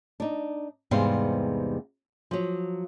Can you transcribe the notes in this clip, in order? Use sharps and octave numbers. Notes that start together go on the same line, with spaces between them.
D4 D#4
E2 G#2 C3 G3 B3 F5
F3 F#3